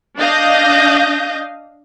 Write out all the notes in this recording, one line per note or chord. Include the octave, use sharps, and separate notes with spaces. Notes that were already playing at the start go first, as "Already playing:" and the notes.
D4 D#5 F5 D#6 G6 A#6